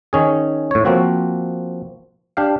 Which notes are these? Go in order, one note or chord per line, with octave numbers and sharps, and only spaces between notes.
D#3 C#4 G#4
A2 C#5
F3 A#3 C4 F#4
D4 G4 F5